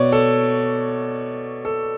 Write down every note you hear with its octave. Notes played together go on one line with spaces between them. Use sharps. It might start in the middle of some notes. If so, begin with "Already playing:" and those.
Already playing: B2 C#5 D5
A4
A4